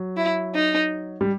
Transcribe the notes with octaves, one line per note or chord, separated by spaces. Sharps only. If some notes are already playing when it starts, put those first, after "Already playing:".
Already playing: F#3
E4
D#4
G3